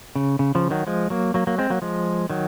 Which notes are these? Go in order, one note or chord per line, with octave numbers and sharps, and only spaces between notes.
C#3
C#3
C#3 F3
D#3 F#3
F3 G#3
F#3 A#3
F#3 A#3
F#3 A#3
G#3 C4
F#3 A#3
F3 G#3
D#3 F#3